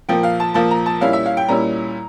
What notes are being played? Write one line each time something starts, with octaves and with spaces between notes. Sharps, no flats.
A#2 F3 A#3 G5
F5
A5
A#2 F3 A#3 A5
A#5
A5
A#2 G3 C#4 E4 F5
E5
F5
G5
A#2 G3 C#4 E4 A#5